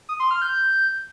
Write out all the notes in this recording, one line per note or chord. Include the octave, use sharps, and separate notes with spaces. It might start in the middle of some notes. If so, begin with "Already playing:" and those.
D#6
C6
F6
G6